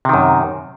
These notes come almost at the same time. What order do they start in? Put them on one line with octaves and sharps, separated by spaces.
C3 D#3 F#2